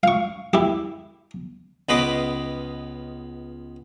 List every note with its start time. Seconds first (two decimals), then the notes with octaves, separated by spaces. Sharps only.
0.03 F5 C#6
0.53 E4 G4
1.89 C#2 B3 B4 D#5 C6 D6